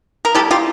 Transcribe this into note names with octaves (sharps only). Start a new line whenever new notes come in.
A#4
G3 B3 E4 G4 A4
F4 G4